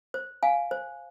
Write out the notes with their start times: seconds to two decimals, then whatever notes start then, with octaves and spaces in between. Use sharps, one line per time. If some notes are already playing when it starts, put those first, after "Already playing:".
0.14 C5
0.43 F5 G#5
0.71 C5